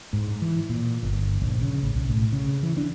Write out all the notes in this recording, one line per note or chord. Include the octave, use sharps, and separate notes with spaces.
G#2
E3
A#2
G1
A#1
C#3
A1
B1
A2
C#3
E3
D4